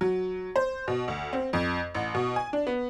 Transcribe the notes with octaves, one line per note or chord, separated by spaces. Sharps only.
F#3
C5
B2
D2
C4
F2
A1
B2
G#5
D4
B3